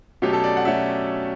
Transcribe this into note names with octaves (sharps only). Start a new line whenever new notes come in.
B2 F#3 A3 C#4 G4
A4
D5
F#5
B2 F#3 A3 C#4 E5